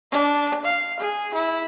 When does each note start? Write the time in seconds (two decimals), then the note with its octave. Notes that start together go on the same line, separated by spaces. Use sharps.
0.12 D4
0.65 F5
1.00 G#4
1.34 E4